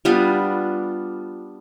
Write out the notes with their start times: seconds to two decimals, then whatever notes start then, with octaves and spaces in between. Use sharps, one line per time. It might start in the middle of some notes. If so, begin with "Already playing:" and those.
0.05 G3 B3 D4 F4